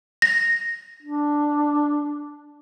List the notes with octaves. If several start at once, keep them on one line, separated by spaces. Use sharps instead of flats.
A#6
D4